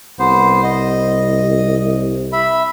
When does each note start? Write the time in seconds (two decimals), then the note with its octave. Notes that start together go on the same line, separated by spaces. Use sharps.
0.19 C2 B3 C5
0.63 D#5
2.32 E5 B5